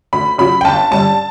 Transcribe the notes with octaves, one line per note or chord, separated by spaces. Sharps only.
D2 B5
C#3 F#3 B5
G5
G1 A5
G2 D3 G3 C#4 A5